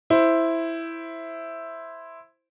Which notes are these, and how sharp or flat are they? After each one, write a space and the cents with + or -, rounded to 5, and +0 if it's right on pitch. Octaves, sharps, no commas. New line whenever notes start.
E4 +0 C5 +0